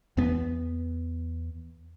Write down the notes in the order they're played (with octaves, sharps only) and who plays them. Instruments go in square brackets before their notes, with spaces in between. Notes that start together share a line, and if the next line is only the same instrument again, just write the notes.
[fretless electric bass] E2 B3